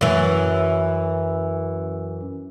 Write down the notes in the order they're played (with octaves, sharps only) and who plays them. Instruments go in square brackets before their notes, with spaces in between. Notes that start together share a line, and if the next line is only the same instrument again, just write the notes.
[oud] F#2 E3